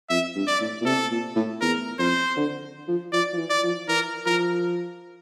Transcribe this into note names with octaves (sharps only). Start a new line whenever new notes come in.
F2 E5
G2
D5
A2
A#2
C3 A4
A#2
A2
E2 A#4
F2 C5
D3
F3
F3 D5
F3
E3
D5
F3
E3 A#4
F3 A#4